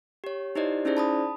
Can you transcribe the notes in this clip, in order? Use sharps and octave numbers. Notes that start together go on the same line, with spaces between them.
G4 C#5
D#4 E4 G4 C5 D5 D#5
C#4 D#4 E4 G#4 C5 D5
A5 B5 D#6